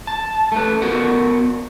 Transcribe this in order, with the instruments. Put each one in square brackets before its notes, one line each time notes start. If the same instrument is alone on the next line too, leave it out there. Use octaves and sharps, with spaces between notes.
[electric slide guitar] A5
A3 B4
B3 F#4 A#4 F#5